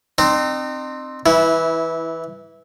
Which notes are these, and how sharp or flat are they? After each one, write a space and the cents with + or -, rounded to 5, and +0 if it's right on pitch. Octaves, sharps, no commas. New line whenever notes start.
C4 +0 D#4 -35
E3 +0 E4 -20